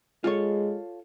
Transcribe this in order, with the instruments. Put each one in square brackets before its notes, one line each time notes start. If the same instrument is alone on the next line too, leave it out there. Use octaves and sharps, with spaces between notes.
[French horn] G#3 [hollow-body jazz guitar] F4 A4 C#5